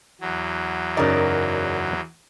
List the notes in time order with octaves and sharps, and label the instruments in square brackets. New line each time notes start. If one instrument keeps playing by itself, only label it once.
[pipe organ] E2 F#3
[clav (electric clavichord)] F#2 C#3 D#4 [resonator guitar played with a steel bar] A#4 D5